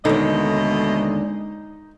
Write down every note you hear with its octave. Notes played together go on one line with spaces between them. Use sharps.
D#2 B2 D3 G#3 A3 D#4 D#5